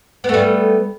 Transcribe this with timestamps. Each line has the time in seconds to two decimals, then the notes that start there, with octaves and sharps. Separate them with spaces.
0.24 B3
0.29 A3
0.34 G3